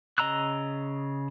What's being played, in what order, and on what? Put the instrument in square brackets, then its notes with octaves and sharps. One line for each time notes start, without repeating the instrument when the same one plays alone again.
[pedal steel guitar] C#3 D#5 A#5 E6 F#6